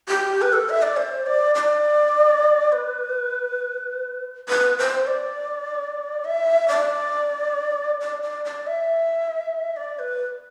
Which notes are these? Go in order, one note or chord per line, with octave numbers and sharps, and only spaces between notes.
G4
B4
A4
E5
D5
C5
D5
D5
B4
B4
C5
D5
E5
D5
D5
D5
D5
E5
D5
B4